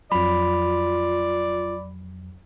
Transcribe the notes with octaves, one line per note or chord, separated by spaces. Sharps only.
F2 F#3 F4 D5 B5